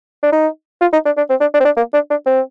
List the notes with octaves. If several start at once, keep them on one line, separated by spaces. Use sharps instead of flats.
D4
D#4
F4
D#4
D4
D4
C4
D4
D4
C4
D4
A#3
D4
D4
C4